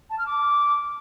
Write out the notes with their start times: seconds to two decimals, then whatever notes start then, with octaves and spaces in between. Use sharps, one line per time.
0.10 A5
0.18 F6
0.27 D6